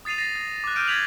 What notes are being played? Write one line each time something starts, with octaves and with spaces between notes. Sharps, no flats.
D#6 A6 C7 D#7 F7
A6 A#6 C7
A6
D6 F#6
D6 F6 G6 D7 D#7
G#6 A6 B6 F7 F#7